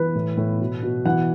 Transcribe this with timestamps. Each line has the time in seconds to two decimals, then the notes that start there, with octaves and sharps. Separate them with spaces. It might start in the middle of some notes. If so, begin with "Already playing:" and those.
Already playing: E3 B4
0.15 A2
0.37 A2
0.60 B2
0.83 B2
1.05 E3 F#5